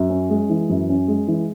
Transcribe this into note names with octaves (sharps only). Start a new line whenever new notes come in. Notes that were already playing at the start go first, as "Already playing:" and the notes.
Already playing: F#2
C#4
G#3
E3
F#2
C#4
G#3
E3